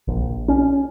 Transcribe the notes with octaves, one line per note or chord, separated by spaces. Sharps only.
A#1
C#4